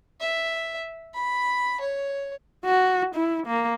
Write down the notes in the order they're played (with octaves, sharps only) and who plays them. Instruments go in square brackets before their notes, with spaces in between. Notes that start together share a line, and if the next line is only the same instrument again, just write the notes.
[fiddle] E5
B5
C#5
[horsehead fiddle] F#4
E4
A#3